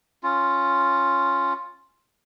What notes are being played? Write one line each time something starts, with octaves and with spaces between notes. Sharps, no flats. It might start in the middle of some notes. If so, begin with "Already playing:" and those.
C#4 F4